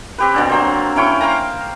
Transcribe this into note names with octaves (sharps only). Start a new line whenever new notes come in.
C4 G4 B4
B2 D3 C4
F#3 A#3 C5
C#4 E4 G5 C#6
C5 F5 G5 A#5